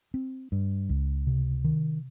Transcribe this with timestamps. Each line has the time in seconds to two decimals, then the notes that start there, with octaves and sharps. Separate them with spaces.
0.14 C4
0.52 G2
0.89 C#2
1.27 C3
1.64 D#3